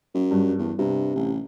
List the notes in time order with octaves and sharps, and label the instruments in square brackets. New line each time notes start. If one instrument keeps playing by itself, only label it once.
[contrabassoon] F#2
[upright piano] G2
[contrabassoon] E2
[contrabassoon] G2 [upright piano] C3
[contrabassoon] A1